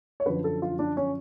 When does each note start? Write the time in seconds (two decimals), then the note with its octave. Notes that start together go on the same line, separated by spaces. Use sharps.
0.20 C#5
0.26 F#2 D3 F3 B4
0.44 A4
0.62 F4
0.79 D4
0.97 C#4